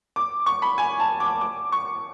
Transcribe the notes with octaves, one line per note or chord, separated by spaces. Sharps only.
D6
C#6
B5
G#5
A5
D6
D6
C#6